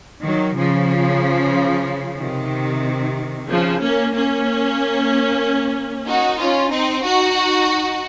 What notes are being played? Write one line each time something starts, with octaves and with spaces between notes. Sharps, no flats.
D#3 F#3
C#3 F3
C3 D#3
C#3 F3
A#3 C#4
A#3 C#4
D#4 F#4
C#4 F4
C4 D#4
D#4 F#4